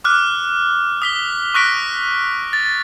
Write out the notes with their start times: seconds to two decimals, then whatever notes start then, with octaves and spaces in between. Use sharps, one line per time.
0.04 D6 F6 F#6
1.02 D#6 B6 G7
1.54 C#6 D#6 F#6 A#6 B6 D7
2.53 A6